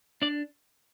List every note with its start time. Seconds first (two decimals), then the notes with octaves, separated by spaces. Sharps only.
0.22 D4 D5